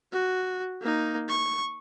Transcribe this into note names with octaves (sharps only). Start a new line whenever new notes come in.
F#4
A#3 D#4
C#6